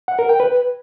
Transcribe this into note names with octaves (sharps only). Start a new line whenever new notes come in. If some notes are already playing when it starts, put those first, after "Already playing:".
F#5
A#4
G5
B4